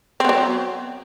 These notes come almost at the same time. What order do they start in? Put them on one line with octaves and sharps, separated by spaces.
C4 B3 F#3